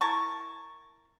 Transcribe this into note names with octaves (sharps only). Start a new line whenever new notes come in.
E4 A#4 A5 C#6